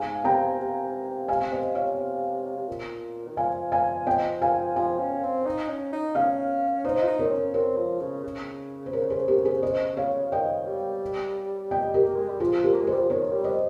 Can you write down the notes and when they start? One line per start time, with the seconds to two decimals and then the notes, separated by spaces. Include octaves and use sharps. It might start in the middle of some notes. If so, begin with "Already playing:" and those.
Already playing: G#2 F5 G#5
0.24 C3 G5 A#5
0.59 C3
1.28 C3 F5 G#5
1.51 C5 D#5
1.75 C#5 F5
2.57 C3
2.67 A#2
3.27 D#3
3.37 F3 F5 G#5
3.72 F5 G#5
4.06 D#5 G5
4.41 F5 G#5
4.76 F3 F5 G#5
4.99 C#4
5.23 C4
5.46 D#4
5.69 C#4
5.93 D#4
6.15 C#4 C#5 F5
6.84 D#4 C5 D#5
7.02 F4
7.07 D#4
7.19 A#4 C#5
7.26 C4
7.31 C#4
7.54 C4 A#4 C#5
7.77 F3
8.00 C#3
8.24 C#3
8.86 C5
8.93 A#4 C#5
9.10 G#4 C5
9.28 G4 A#4
9.45 G#4 C5
9.63 C5 D#5
9.97 C#5 F5
10.32 D#3 D#5 G5
10.66 G3
11.71 D#5 G5
11.94 G4 A#4
12.04 A#3
12.16 G#3
12.28 G3
12.40 F3 F4 G#4
12.64 G4 A#4
12.73 A#3
12.82 G#3
12.87 G#4 C5
12.92 G3
13.01 F3
13.09 D#3 A#4 C#5
13.33 G3
13.44 C5 D#5